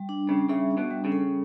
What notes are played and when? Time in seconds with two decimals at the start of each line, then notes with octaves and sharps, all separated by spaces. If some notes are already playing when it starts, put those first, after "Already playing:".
Already playing: G3
0.09 D4
0.29 C#3 G3
0.49 C#3 E5
0.71 D4
0.77 B2
0.91 G3
1.05 C#3
1.12 A4